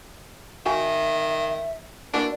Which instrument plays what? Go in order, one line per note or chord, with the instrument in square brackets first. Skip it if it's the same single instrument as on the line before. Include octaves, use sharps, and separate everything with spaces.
[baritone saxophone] D#3 [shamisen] F#4 F5 G#5 [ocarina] E5
[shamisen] E3 A#3 F#4 [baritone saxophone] D4 [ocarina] D5